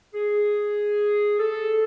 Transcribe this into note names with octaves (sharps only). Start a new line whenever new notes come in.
G#4
A4